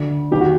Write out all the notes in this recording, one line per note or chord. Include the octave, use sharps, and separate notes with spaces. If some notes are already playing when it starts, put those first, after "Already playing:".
Already playing: D2 D3
D#2 D#3 G4
F#4